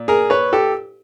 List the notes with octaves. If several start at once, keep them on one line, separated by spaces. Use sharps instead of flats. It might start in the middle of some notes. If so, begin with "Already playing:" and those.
Already playing: A#2
G#4 A#4
B4 C#5
G4 A4